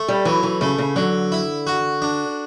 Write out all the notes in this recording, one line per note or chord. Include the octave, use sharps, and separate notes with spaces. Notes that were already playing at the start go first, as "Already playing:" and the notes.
Already playing: A3
G3
E3 F#3
E3
C#3 A3
C#3
D3 F#3
E4
F#4
D4